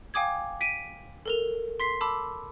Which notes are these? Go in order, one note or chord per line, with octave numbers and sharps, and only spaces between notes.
F5 G5 G#5 D6 D#6 G#6
B6 D7 D#7
A4 A#4 F7
C6 B6 C7
A5 B5 D6 E6